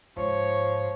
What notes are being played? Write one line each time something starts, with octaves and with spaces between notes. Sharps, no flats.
G#2 F3 C#5